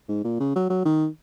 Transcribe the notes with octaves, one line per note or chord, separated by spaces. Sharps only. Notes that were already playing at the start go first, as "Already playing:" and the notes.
G#2
A#2
C#3
F#3
F#3
D#3